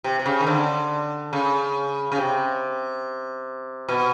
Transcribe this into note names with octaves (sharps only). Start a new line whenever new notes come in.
C3
C3
C#3
D#3
D3
C#3
C#3
C3
B2